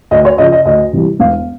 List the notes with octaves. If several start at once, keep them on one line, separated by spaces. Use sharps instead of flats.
D2 D#5
C#5
C#3 F3 D#5
D#5
D2 D#5
C3 E3 G3
E1 F5